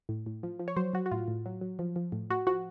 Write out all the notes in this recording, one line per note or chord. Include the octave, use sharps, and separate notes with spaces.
A2
A2
F3
F3
C#5
F#3 C5
F#3 F#4
F#4
A2 F4
A2
F#3
F#3
F3
F3
A2
A2 F#4
F3 F#4